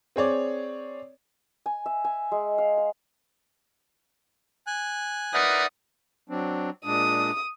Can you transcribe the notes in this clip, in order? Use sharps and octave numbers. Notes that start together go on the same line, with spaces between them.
C4 G#4 C#5 D5
G#5
E5
G#5
G#3
F5
F5
G#5 F#6
D#4 A#4 B4 D5 E5 F#5 D#6
F#3 C4 D4
A#2 G#3 D4 D#6